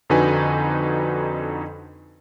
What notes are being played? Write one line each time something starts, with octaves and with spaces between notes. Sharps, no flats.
F2 D3 D#4 F#4 B4 G#5